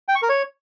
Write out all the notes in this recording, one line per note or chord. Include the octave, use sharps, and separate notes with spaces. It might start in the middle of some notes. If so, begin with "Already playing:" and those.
G5
C#6
A#4
C#5